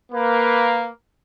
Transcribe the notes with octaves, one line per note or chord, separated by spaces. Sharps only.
A#3 B4